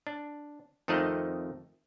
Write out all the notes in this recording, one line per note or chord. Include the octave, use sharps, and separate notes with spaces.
D4
F2 D#3 A3 C4 D#4 D#5